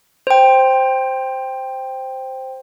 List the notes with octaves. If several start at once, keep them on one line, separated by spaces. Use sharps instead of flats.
C5 G5